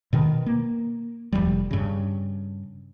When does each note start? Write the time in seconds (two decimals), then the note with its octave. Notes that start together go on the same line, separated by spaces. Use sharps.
0.13 B2 D#3
0.46 A#3
1.33 F1 E2 F3 G3
1.71 G2 C#3